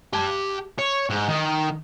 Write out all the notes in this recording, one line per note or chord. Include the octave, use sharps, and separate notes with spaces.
G4 A5
C#5
G#2
D#3